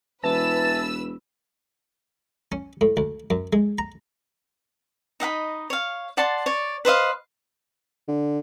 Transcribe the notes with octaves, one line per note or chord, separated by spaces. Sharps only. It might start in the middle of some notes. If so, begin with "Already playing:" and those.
E1 E3 B4 A5 E6
C#4
A2
D2
F#2
G#3
A#5
D#4 D#5 F#5 B5
C#5 F5
D5 F#5 A5 C6
C#5 D5
B4 C5 D#5 F5
D3